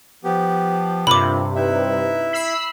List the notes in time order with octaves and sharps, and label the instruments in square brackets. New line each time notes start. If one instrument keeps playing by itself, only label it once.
[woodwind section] F3 [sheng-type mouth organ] B3 G4
[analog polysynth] G2 C3 [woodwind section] A#3 C4 F4 [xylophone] B5 D6
[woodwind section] D#4 B4 [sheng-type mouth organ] E4 E5
[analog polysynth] B5 E6 C7